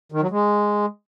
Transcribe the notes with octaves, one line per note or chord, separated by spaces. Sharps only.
D#3
F#3
G#3